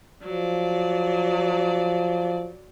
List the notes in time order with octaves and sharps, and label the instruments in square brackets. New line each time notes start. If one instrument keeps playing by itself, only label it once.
[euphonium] F3 [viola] F#3 D5